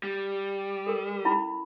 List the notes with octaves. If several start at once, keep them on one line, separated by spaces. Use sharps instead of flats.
G3
A4 A#4
C#4 E4 B5